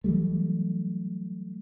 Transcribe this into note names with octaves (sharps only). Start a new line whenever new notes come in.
E3 F#3 G3 A3